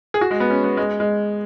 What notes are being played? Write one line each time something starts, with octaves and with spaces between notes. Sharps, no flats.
G#4
F#4
G#3
B3
C#4
B3
G#3
G#3